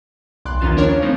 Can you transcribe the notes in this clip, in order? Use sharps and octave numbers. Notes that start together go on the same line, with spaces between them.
B1 D5 C6 D6 F#6
D#2 D#3 C#4 F4 A6 E7
F3 D4 A#4 C#5
C#3
F3 A3 C4 C#4 D#4